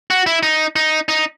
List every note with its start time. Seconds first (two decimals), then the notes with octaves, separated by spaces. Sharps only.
0.10 F#4
0.26 E4
0.43 D#4
0.76 D#4
1.08 D#4